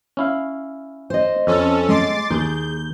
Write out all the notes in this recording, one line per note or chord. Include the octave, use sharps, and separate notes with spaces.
C#4 E4 F5
C5 D#5
F2 C#4 A4
G#3 C6 D6 A6
D#2 G#4 G6